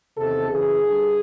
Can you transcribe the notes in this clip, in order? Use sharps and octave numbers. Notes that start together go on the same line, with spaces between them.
E2 C3 D#3 A4
F#2 C#3 E3 G#4
G2 D3